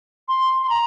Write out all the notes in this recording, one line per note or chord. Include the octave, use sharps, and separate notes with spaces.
C6
C6
A#5